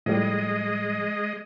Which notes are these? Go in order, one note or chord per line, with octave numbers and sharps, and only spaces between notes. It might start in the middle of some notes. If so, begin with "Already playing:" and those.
A2 F3 G3 G#3 D#5